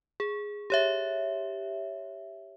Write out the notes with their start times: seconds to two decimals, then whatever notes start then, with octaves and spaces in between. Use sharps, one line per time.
0.20 G#4
0.70 G4 C#5 E5